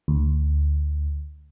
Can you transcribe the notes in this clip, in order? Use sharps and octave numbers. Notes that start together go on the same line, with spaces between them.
D2